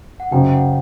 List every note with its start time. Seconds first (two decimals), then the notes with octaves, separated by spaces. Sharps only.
0.20 F#5
0.31 F#1 F#2 C#3 G5
0.49 G5
0.53 F#5